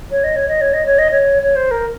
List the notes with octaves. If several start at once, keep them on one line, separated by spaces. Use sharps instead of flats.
C#5
D#5
C#5
D#5
C#5
D#5
C#5
D#5
C#5
C#5
C5
A#4